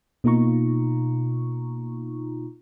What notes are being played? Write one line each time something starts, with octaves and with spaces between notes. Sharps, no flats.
B2 A#3 D#4 F4 A#5 C#6